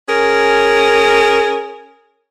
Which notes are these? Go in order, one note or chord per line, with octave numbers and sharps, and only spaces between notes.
C#4 G#4 A#4